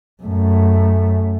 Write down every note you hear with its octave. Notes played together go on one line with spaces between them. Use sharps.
F#2 A3